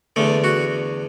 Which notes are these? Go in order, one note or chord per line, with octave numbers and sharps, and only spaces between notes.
E2 D3 A3
F#4